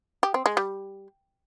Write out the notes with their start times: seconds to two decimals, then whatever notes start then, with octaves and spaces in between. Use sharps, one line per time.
0.23 G4
0.34 C4
0.46 G#3
0.57 G3